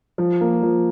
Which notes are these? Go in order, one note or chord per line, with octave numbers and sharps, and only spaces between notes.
F3
A#3
F3